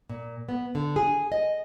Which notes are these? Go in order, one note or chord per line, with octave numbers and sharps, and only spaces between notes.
A#2
B3
D3
G#4
D#5